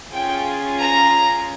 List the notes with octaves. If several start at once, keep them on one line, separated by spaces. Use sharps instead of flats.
C#4 F4 G#4 G5
A#5